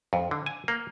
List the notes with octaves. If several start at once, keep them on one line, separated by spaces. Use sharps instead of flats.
F2
D3
G#5
A#3